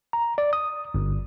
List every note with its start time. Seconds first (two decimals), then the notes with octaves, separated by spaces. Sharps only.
0.13 A#5
0.38 D5
0.53 D#6
0.94 G1